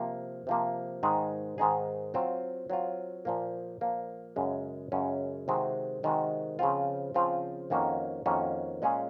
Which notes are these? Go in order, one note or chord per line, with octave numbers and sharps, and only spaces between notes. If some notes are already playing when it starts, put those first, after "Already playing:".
Already playing: C3 F3 A#3
C3 F3 A#3
G#2 D#3 G#3 D#4 G#4
G#2 D#3 G#3 D#4 G#4
F#3 C4 F4
F#3 C4 F4
A#2 F3 A#3
A#2 F3 A#3
F#2 C#3 G#3 C#4
F#2 C#3 G#3 C#4
C3 D#3 G#3 C4 F#4
C3 D#3 G#3 C4 F#4
C#3 F3 C4 F4
C#3 F3 C4 F4
F2 D#3 A#3 C#4 F#4
F2 D#3 A#3 C#4 F#4
A#2 G#3 C#4 F4 G#4